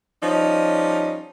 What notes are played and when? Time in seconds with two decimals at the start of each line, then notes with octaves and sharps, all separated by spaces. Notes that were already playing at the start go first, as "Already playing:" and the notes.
0.22 F3 G3 C#4 D#4